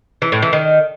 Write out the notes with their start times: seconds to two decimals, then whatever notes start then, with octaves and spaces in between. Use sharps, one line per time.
0.22 E3
0.32 A2
0.42 E3
0.53 D#3